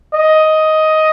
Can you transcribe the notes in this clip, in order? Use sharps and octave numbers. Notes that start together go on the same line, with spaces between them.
D#5